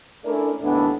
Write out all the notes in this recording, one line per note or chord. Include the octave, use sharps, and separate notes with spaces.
A3 C#4 D4 E4 A#4 D5
D#2 A2 D3 E3 B3 D4